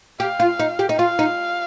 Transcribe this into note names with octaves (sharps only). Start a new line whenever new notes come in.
G4 F5
F4
D#4
G4
D#4
F4 F5
D#4